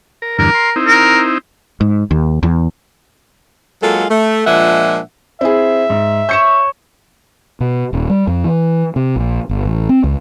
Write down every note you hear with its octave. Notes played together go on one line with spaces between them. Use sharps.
A#4
E2 G2 D3 A#4
C6
C4 D#4 E4
A#4
G#2
D#2
E2
F#3 G#3 A#3 F4 A4
A3
A#2 F3 G#3 D4 E5 F#5
C4 E4 G#4 E5
G#2
C#5 G6 C#7 E7
B2
D#1
G3
F2
E3
C3
A#1
G1
A1
C4
C#2